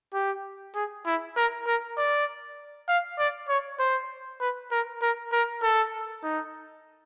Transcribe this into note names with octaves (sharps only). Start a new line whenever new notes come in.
G4
G#4
E4
A#4
A#4
D5
F5
D5
C#5
C5
B4
A#4
A#4
A#4
A4
D#4